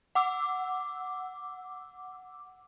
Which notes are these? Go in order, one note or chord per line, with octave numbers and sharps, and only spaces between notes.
F#5 D6 E6